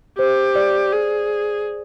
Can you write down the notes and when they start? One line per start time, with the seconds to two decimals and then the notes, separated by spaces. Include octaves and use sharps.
0.19 G4 C5
0.55 D5
0.92 G#4